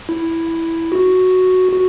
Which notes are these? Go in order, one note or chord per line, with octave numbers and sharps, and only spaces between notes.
E4
F#4
F#4